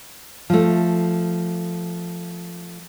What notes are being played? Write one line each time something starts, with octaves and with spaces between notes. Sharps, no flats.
F3 A3